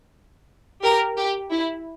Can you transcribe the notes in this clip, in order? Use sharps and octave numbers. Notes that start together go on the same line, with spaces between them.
G4 A#4
G4
E4